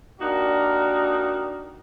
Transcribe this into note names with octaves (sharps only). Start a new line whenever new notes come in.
A#3 D4 D#4 F#4 G4 A#4